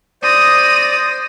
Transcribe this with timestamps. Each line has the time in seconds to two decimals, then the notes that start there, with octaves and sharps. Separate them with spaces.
0.23 C5 D5 D#6 A#6